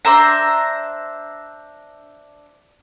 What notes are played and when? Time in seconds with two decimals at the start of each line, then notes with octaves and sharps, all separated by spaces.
0.05 D4 C5 E5 A#5